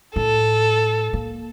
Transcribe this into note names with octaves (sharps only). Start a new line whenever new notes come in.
A2 A4
A#3